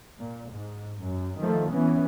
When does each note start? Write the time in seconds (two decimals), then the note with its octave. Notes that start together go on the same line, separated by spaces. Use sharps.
0.19 A#2
0.51 G#2
1.01 F#2
1.40 D#3 F3 A3
1.70 E3 B3 C#4